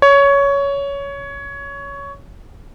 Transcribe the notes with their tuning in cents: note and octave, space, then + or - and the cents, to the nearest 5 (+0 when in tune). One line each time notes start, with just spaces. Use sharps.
C#5 +15